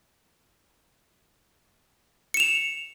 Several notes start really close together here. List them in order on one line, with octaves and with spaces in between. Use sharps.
C#7 E7 F7